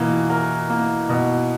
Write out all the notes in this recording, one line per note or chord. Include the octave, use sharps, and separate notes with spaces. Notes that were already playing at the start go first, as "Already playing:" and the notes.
Already playing: B2 E3 A#3
A#4
A#3
B2